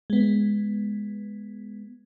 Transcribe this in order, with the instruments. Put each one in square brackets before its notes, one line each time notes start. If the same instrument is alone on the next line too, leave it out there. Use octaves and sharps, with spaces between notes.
[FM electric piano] G#3 B3